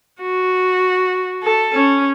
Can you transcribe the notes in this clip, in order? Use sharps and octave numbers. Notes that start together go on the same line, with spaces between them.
F#4
A4
C#4